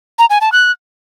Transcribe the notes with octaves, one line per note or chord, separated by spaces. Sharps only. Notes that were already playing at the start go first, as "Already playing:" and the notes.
A#5
G#5
A5
F#6